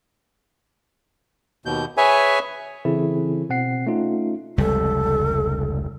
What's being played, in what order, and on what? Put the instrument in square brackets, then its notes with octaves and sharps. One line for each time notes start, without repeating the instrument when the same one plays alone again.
[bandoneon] D#2 B2 G6
G#4 B4 C#5 E5 G#5
[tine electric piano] C#3 E3 C4 E4 G#4 A4
B2 C4 F#5 C7
A3 C#4 D#4 F4
[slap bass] F1 C#2 G3 [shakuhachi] A4